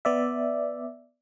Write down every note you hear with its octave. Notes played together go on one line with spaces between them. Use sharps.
B3 D5 E5